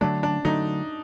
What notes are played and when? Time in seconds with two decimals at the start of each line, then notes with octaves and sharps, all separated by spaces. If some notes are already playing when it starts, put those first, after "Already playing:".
0.01 D3 F#3 A3 D4
0.23 D4
0.45 D3 F#3 A3 D#4